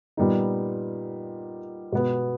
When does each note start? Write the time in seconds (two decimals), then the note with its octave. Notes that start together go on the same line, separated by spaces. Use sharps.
0.17 A#2 G3 B3 D#4
1.92 B2 G#3 B3